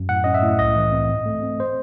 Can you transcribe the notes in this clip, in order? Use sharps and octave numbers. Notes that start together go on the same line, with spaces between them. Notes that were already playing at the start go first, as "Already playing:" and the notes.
Already playing: F#2
A2 F#5
C#4 D#5
E5
A2
C2 D#5
E3
C4
G#2
A3
C4
C5